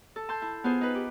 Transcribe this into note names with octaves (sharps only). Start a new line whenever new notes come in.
A4
A5 C6 G6
E4
B3 F4 G#4 C5
D#4 B4
G4